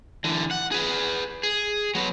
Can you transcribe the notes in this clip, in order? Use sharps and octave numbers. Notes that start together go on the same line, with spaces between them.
D3 E3
F#5
G#4 B4
G#4
F#3 B3